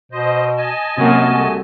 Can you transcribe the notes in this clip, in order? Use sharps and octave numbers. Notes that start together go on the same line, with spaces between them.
B2 C5 D#5
D#5 G#5 A5
F#2 C3 A#3 F#4
C2 A3